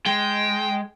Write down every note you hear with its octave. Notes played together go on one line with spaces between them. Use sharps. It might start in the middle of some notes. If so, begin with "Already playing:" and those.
G#3 G5